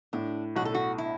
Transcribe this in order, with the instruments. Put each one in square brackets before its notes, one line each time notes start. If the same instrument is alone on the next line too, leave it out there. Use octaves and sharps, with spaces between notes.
[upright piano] A2 [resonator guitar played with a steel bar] D4
[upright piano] B1 [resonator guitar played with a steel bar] F#4
[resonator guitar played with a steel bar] A4
F#4
E4